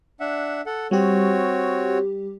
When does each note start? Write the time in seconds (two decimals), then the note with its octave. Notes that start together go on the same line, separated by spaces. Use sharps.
0.20 D4 E5 F#5
0.66 A4 F#5
0.91 G3 C4 F#4 G4 C#5